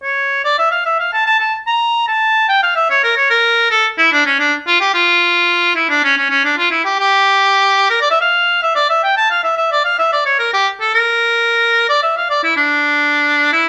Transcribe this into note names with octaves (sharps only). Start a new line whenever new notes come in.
C#5
D5
E5
F5
E5
F5
A5
A5
A5
A#5
A5
G5
F5
E5
C#5
A#4
C#5
A#4
A4
E4
D4
C#4
D4
F4
G4
F4
E4
D4
C#4
C#4
C#4
D4
F4
E4
G4
G4
A#4
D5
E5
F5
E5
D5
E5
G5
A5
F5
E5
E5
D5
F5
E5
D5
C#5
A#4
G4
A4
A#4
D5
E5
F5
D5
E4
D4
E4